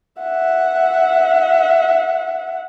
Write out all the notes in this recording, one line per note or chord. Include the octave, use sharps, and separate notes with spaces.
E5 F#5